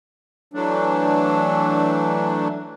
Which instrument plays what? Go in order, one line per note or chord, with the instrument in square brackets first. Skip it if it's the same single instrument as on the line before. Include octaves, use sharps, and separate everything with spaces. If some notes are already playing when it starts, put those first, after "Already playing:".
[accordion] E3 F#3 A3 D4